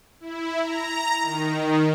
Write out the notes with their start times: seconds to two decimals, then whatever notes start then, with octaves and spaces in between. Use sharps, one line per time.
0.20 E4
0.62 A#5
1.22 D#3